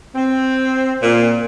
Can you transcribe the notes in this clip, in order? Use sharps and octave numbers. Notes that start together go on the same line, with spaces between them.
C4
A#2